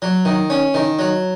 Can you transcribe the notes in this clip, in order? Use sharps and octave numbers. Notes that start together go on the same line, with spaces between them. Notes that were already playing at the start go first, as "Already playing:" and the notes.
F#3
D#3
C#4
D#3
F#3